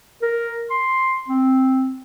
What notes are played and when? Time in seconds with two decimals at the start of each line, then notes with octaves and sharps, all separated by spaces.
0.22 A#4
0.70 C6
1.28 C4